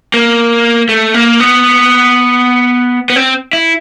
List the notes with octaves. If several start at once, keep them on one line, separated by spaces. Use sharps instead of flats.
A#3
A3
A#3
B3
B3
C4
E4